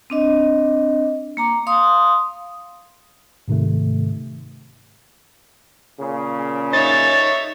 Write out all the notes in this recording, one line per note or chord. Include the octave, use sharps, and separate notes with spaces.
C4 D4 D#5
A#3 A#5 D6
F5 C6 D#6
G#2 C3 D#3 A3
A#2 C#3
D#4 C#5 E5 A6